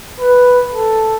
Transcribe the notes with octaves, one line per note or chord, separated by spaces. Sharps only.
B4
A4